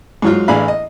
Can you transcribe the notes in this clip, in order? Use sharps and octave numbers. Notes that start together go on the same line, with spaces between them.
G#2 F#3 F4
A1 E3 D4 G#4 F5 B5
D#5